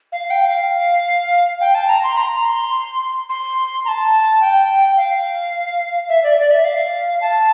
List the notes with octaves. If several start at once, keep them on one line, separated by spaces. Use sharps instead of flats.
F5
G5
F5
G5
A5
A#5
C6
A#5
C6
C6
A#5
A5
G5
F5
E5
D5
D5
E5
F5
A5